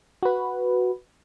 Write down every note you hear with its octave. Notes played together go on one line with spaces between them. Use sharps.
F#4 B4